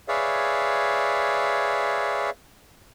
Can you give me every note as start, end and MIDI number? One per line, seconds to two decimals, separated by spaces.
0.08 2.30 68
0.08 2.30 71
0.08 2.30 73
0.08 2.30 74
0.08 2.30 76
0.08 2.30 77